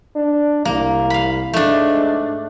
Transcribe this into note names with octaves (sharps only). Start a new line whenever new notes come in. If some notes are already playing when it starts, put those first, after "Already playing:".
D4
C2 A#3
F5 B5
G#2 A3 D4